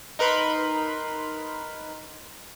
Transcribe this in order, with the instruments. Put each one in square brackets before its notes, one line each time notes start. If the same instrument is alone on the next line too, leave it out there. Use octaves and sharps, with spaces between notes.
[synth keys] D#4 A#4 B4 B5 C6